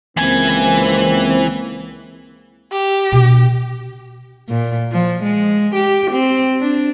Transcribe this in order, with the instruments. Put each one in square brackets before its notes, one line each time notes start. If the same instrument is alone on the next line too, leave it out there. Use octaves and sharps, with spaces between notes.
[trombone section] C#2 A#3 C4 [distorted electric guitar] E3 G#5
[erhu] G4
[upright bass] B2 D4
[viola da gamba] A#2
F3
G#3
G4
C4
D4